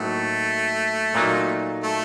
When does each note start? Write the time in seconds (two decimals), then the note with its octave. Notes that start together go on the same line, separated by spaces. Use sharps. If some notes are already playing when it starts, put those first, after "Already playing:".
Already playing: A2 F#3 A3 A#3 D#4
1.15 A#2 F#3 A#3 D#4
1.83 A3